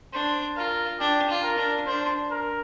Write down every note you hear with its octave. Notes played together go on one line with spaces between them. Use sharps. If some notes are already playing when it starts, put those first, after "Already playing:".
D4 C5
F4 A#4
D4 G4
F4
A#4
D4
D4 C5
A#4